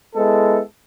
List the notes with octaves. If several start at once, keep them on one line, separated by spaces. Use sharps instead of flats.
G#3 B3 E4 A4